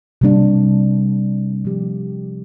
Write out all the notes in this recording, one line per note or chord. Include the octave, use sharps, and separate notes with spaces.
C3 G3 A#3 D4
F3 A#3 G4